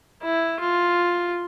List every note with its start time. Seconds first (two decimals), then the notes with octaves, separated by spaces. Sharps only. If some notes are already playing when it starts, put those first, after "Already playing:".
0.22 E4
0.60 F4